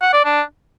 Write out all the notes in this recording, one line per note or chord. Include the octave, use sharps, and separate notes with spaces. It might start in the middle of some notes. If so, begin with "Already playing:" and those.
F#5
D5
D4